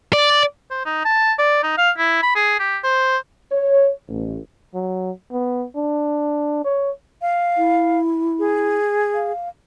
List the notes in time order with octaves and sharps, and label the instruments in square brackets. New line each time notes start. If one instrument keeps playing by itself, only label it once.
[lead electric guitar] D5
[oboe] C5
D#4
A5
D5
D#4
F5
E4
B5
G#4
G4
C5
[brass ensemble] C#5
A1
[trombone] F#3
B3
D4
C#5
[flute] F5
[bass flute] E4
[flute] G#4
[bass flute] F5